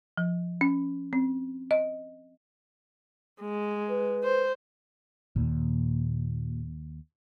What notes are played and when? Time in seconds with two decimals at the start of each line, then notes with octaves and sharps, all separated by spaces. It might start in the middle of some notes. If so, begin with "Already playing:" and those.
0.17 F3
0.61 C#4
1.13 C4
1.71 D#5
3.41 G#3
3.89 B4
4.24 C5
5.36 D#2 A#2